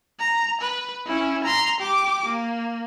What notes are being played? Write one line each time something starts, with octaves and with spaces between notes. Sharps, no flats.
A#5
B4
C#4 E4
A#5 C6
G4 D6
A#3